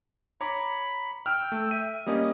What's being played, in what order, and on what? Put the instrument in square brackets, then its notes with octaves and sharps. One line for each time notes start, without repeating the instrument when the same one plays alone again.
[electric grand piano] C#5 A#5 D6 [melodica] B5
[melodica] G5 E6 [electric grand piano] F6
[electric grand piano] A3
[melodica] E5 [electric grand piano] D#7
[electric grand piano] G3 A#3 C#4 [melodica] D#5